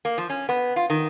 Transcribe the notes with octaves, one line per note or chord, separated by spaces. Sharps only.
A#3
F3
C#4
B3
F4
D#3